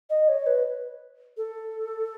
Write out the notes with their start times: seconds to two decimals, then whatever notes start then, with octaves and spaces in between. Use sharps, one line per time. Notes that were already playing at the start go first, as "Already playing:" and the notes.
0.10 D#5
0.29 C#5
0.47 B4
1.37 A4